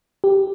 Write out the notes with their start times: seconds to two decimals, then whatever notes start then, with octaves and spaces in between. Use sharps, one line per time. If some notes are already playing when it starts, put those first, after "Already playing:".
0.24 G4